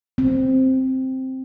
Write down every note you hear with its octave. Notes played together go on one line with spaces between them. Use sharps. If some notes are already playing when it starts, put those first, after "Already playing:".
C4